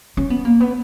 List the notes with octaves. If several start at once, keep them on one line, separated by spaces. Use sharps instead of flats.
C#4
B3
A#3
B3